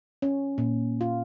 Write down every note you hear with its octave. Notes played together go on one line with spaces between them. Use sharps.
C#4
A#2
F4